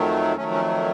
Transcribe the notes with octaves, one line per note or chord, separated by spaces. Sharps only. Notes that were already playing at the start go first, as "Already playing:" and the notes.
Already playing: F2 D#3 F#3 A3
F2 D#3 F#3 A3 C#4
C#4